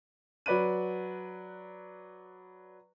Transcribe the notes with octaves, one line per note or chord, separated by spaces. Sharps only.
F#3 B4 D5 B5 F#6 D#7